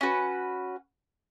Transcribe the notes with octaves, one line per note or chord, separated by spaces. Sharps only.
C#4 F#4 B4